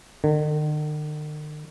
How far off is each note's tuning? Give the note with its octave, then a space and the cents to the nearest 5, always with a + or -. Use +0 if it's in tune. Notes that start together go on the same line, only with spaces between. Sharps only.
D#3 -45